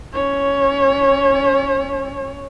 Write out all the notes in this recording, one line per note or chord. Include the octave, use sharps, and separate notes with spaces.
C#4 C#5